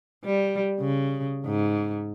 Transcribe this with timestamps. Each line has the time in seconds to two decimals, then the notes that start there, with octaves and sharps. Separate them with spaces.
0.25 G3
0.80 C#3
1.46 G#2